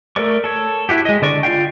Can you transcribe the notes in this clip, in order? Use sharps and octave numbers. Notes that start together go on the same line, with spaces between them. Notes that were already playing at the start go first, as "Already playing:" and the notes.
A3 A4 A#4 D5 C#6
A4 C#5
E4 F#4 G4
G#3 D#5
D3 D5 C#6
F4 D5 F5 G5